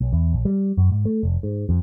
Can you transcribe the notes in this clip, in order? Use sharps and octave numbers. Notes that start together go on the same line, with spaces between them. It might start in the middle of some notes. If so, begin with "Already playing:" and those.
B1
E2
A#1
G3
F#2
G#2
A3
F1
G#2
F2